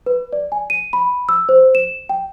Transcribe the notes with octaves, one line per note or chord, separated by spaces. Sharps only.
B4
D5
G#5
D#7
B5
E6
C5
E7
G5